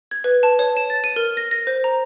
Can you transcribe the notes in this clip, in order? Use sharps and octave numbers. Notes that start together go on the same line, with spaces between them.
G#6
B4
A5
C#5
E7
A6
D#7
A#4
A#6
A#6
C5
A#5